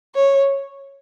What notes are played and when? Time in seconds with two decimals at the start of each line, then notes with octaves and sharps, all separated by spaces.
0.15 C#5